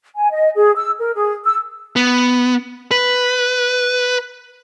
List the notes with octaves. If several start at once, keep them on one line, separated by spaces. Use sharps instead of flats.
G#5
D#5
G#4
E6
A#4
G#4
E6
B3
B4